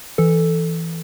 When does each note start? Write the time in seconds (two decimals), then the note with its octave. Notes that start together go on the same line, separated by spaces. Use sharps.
0.18 E3 A4